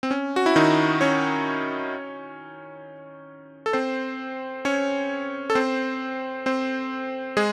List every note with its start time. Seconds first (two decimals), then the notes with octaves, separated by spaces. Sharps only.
0.03 C4
0.11 C#4
0.36 F#4
0.46 E4
0.56 D#3 D#4
1.01 C#4 C#5
3.66 A4
3.73 C4 C5
4.65 C#4 C#5
5.50 A4
5.55 C4 C5
6.46 C4 C5
7.37 G#3 G#4